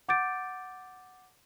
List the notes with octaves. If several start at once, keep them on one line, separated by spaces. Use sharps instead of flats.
F#5 D6 G6 A6 D7